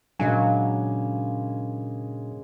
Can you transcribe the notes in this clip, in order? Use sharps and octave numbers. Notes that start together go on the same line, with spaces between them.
A#2 C#3 F#3 G#3 A#3 D4 G#5